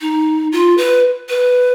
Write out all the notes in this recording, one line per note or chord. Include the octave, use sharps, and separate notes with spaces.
D#4
F4
B4
B4